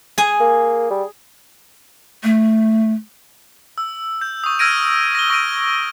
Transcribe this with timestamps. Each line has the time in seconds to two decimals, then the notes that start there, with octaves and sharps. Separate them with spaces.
0.18 G#4 G#5
0.40 A#3
0.90 G3
2.24 A3
3.78 E6
4.21 G6
4.44 C#6 D#6
4.59 E6 F6 G#6 A#6 D7 D#7
5.15 A#6 G7
5.30 C#6 A#6 D7 D#7